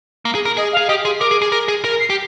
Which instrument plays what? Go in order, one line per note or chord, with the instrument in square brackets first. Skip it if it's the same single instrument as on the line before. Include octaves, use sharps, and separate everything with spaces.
[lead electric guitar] A#3
G#4
A#4
[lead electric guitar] G#4 [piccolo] D#5
[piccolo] F5
[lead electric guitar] G#4
[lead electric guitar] G4 [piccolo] D#5
[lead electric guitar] G#4 [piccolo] C6
[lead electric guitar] A#4 [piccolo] D6
[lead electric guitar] G#4
G#4
A#4
G#4
[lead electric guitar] A#4 [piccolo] A#6
[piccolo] C7
[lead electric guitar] G4